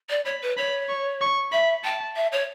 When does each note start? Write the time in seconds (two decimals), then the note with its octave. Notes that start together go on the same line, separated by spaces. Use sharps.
0.09 D5
0.25 C#5 B5
0.41 B4
0.57 C#5 B5
0.89 C#6
1.21 C#6
1.52 E5 B5
1.84 G5 A5
2.16 E5
2.32 C#5